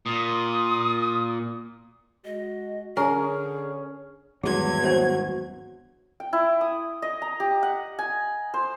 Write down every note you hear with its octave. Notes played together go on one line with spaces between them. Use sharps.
A#2 D#6
G#3 F#4 D#5
D3 C#4 G#4 A#4
G#1 E2 G2 F#3 G#4 G#6
D4 F#4 C5 C#5
G5
E4
D#6
D#5
A#5
G4
F#5
G#5
C5